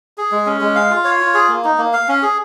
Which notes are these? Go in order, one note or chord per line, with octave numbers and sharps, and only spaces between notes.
G#4
G#3
C#4
G#3
F5
F4
C#5
F4
G#4
A#3
D#4
A#3
F5
C#4
G#4